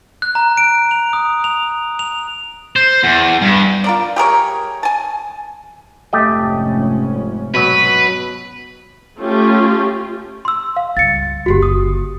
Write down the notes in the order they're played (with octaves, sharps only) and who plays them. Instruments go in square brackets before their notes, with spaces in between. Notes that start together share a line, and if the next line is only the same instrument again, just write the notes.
[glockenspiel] F#6
A#5
D7
F7
D#6
F7
F7
[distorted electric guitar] C5
E2
G2
[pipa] F4 A#4 D5
G4 G#4 A#4 C#5
G#5 A5
[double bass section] F1 G#2 C#4 [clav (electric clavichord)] A3 G4 D#5
[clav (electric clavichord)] B2 F#3 [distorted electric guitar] B4
[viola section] A3 C#4 F4 G4
[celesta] C6 E6
F5
[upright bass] C#2 G2 [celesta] A6 C#7
[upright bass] F#1 D3 [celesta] F#4 G4
[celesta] D#6